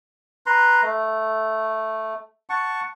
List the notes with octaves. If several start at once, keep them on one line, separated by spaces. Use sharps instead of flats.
B4 A#5 C6
A3
F#5 A5 C#6